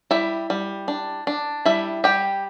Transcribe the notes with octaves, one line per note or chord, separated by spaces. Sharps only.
G3 E4 E5
G3
D4
D4
G3 E4 E5
G3 G4 G5